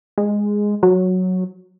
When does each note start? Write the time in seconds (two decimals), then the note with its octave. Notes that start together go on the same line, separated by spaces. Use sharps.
0.18 G#3
0.83 F#3